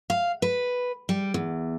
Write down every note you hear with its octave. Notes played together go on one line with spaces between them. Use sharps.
F5
B4
G3
E2